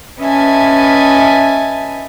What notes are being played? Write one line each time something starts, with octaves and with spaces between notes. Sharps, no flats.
C#4 B4 D#5 E5 G#5 A5